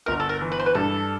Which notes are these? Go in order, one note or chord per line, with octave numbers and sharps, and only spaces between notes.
G1 A#4
A4
A#4
E3
B4
C5
B4
G2 A4